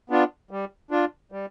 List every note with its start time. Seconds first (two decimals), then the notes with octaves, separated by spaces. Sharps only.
0.10 B3 D4 F4
0.51 G3
0.91 D4 F4
1.32 G3